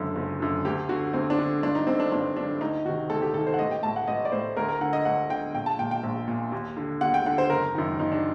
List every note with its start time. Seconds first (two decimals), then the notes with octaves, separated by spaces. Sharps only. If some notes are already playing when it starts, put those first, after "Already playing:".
Already playing: F#1 F#2 D3 A4
0.16 F#1
0.40 F#2 D3
0.65 D2 G4
0.89 D3 F#4
1.13 D2 C4
1.30 D4
1.39 D3
1.63 G1 D4
1.75 D#4
1.87 G2 D3 C4
2.00 D4
2.12 G1 D4
2.36 G2 D3 D4
2.61 D2 D#4
2.85 C3 D#3 F#4
3.09 D2 A4
3.22 G4
3.34 C3 D#3 A4
3.47 C5
3.54 F#5
3.59 A1 D#5
3.71 G5
3.83 A2 A5
3.96 F#5
4.08 A1 D#5
4.25 D5
4.32 A2 C5
4.57 D2 A#4
4.69 A#4
4.81 D3 F#5
4.93 D#5
5.05 D2 F#5
5.30 D3 G5
5.54 A#1 G5
5.66 A5
5.79 A#2 G5
5.91 G5
6.03 A#1
6.28 A#2
6.52 D#2
6.77 D3
7.01 D#2 F#5
7.14 G5
7.26 D3 F#5
7.38 C5
7.50 F#1 A#4
7.75 F#2 D#3
7.99 F#1 D#4
8.12 D4